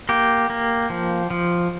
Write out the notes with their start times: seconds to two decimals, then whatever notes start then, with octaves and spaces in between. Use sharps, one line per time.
0.09 A#3 G4
0.50 A#3
0.90 F3
1.30 F3